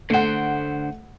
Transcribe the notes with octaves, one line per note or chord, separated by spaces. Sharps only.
D3 A3 C5 F#5